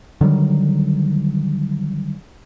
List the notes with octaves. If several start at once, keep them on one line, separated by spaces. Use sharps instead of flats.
D3 D#3 F#3 G3